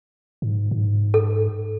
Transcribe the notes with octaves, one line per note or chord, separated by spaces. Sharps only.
G#2
G#2
A4